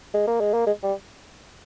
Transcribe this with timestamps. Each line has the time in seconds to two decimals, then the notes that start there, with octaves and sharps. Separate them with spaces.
0.14 G#3
0.27 A#3
0.41 G#3
0.54 A#3
0.67 G#3
0.83 G3